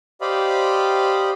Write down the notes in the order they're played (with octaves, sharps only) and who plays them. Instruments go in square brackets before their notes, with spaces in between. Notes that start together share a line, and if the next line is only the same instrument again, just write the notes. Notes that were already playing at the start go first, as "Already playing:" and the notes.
[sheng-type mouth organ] G4 C5 D5 D#5 F5 B5